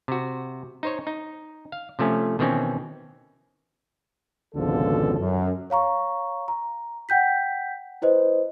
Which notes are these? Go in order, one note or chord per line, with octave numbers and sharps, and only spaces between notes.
C3 F#4
D#4 C5 C#5
D#4
F5
C3 F3 A3 C#4
B2 D#3 E3 C4 C#4
G#1 C#2 B2 D3 F3 A4
F#2
C#5 F5 A#5 C#6
A#5
F#5 G5 G6 B6
E4 B4 C5 D#5